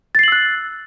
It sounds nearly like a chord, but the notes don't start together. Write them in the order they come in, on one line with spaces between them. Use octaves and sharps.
A6 C7 F#7 E6 F#6